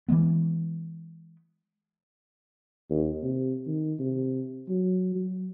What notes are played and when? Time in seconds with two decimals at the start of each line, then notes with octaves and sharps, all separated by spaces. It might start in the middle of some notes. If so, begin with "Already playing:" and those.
0.08 E3 F3 G#3 B3
2.90 D#2
3.23 C3
3.67 D#3
3.99 C3
4.69 F#3
5.15 F#3